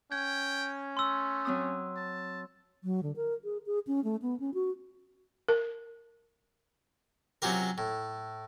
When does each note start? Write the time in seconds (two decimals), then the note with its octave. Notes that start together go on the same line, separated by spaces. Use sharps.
0.12 C#4 G5 G#6
0.97 A3 C6 E6
1.45 F#3 C4 D#6
1.97 A5
2.84 F#3
3.03 D3
3.16 A#4
3.44 G#4
3.66 G#4
3.87 C#4
4.04 A3
4.22 B3
4.40 C#4
4.54 F#4
5.48 A#4
7.42 C3 F#3 C#4 F4 G4 A#4
7.78 A2